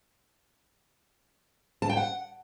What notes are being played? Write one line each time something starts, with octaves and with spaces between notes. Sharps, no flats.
A5
G5
F#5